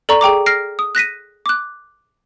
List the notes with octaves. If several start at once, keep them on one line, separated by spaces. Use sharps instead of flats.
A4 D5 A#5 C#6
G#4 G5 A#5 D6
F6 A#6 C7 D7
D#6
F#6 A#6 B6 D#7
D6 F#6